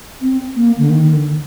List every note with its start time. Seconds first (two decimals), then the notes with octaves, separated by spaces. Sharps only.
0.22 C4
0.56 A#3
0.78 D3
0.89 D#3
1.13 D3